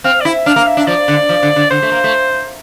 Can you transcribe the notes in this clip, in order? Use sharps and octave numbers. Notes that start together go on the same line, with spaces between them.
C4 F5
D5
E4 E5
D4 F5
A#3
E5
D4
F3 D5
D3
F3
D3
D3
D3 C5
A3
A#3
A3